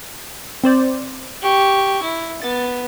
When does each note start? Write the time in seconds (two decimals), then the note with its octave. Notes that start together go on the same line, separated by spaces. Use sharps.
0.64 C4 C5 D5
1.42 G4 C#6
2.02 E4
2.42 B3 A6